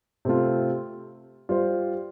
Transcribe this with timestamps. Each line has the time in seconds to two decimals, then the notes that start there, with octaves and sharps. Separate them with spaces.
0.25 C3 A3 F4
1.49 G3 F4 C5